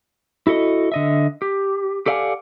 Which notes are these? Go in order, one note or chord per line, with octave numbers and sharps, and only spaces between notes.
E4 F#4 A4 D#5
D3 D#5 E5
G4
G4 A4 D5 F5 F#5 G#5